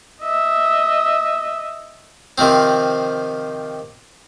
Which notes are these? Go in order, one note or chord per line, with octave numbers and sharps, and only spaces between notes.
D#5 E5
C3 D#3 F3 C4